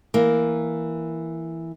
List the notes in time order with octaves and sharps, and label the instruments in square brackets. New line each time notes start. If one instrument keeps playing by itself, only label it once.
[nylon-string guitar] E3 A#3 A#4